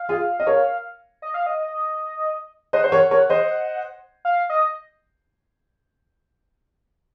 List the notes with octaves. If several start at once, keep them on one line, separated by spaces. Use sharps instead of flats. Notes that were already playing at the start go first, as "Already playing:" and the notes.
Already playing: F5
F4 G#4
D#5
A#4 C#5
D#5
F5
D#5
C5 D#5 F#5
C5
A#4 C#5
A#4 C#5
C5 D#5
F5
D#5